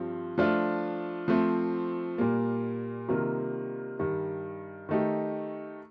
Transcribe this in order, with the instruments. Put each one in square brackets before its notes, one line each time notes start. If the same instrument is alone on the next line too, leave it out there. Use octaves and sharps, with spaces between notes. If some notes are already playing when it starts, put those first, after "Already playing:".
Already playing: [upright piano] G2 F3 C4
F3 A3 D4 F4
F3 A3 C4
A#2 G3 A#3
C3 D#3 G3 A#3 F4
G2 D#3 G3
D#3 A3 D#4 G4